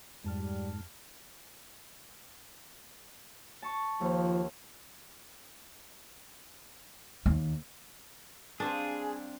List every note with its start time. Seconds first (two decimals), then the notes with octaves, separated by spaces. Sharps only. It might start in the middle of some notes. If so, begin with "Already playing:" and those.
0.24 F2 G#2 G3 A5 F6
3.62 A5 C#6
4.01 D#2 F3
7.26 D#2
8.60 G3 C4 D4 F4 G#4